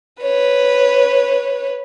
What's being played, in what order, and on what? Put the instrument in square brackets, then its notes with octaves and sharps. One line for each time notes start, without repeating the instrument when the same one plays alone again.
[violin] B4 C#5